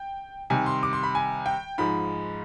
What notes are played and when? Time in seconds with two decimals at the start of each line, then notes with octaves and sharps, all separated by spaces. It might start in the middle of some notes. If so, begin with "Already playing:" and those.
Already playing: G5
0.50 C3 D#3 G3 G#5
0.66 C6
0.83 D6
0.93 C6
1.03 B5
1.15 G#5
1.46 G5
1.78 G#2 F3 G#3 B5